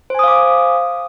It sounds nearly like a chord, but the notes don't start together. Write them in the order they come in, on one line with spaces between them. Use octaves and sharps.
C5 G#5 D#6 F5 D6